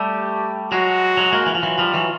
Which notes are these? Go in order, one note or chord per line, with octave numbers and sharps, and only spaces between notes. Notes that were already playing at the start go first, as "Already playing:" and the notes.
Already playing: G3 A3 G4
F#3 G#3 F#4
F#3 G#3
G#3 A#3
E3
F3
E3 F#3 F4
F3 G3
E3 F#3